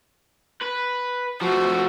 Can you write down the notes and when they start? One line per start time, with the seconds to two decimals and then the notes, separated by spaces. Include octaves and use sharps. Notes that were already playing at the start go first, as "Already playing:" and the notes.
0.62 B4
1.42 F3 A3 F#4